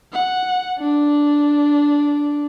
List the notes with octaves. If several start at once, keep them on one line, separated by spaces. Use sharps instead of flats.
F#5
D4